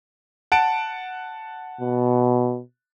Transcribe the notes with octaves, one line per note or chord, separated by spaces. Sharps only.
F#5 A5 D7
B2